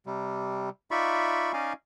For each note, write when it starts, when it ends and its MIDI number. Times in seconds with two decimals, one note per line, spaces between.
0.06 0.69 48
0.06 0.69 55
0.91 1.52 63
0.91 1.52 65
0.91 1.52 74
0.91 1.52 76
0.91 1.52 83
0.91 1.52 85
1.53 1.73 61
1.53 1.73 63
1.53 1.73 74
1.53 1.73 75
1.53 1.73 77
1.53 1.73 80